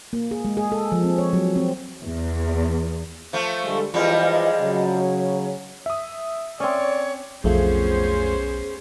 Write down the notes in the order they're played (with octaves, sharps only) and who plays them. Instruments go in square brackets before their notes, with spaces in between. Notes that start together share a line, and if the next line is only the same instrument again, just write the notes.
[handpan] A#3
G#4
G#3
G#4
A4
F3
C4
C#5
F#3
C4
[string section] E2
[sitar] F3 A3
[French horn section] D3 G3 G#3 [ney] A4
[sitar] F2 G3 G#3 [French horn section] E3 F4 [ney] D#5
[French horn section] C#3 F#3
[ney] C#5
[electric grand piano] E5 D#6
[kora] C4 C#4 [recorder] C#5 [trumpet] D5
[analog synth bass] B1 [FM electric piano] F2 A3 F4 [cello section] B3 C#4 C5 [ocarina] G#4